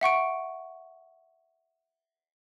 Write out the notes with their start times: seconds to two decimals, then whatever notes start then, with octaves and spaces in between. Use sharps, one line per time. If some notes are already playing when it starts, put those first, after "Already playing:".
0.01 E5 F#5 C#6 D7